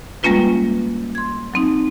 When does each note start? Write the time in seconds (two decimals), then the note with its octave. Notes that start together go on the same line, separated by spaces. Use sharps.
0.23 G3 G#3 A#3 C#4 F4 B4
1.15 C6 G#6
1.54 F#3 C4 D#4